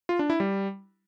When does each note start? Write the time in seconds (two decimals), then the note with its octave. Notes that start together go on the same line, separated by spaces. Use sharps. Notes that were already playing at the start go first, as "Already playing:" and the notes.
0.09 F4
0.19 D4
0.30 E4
0.40 G3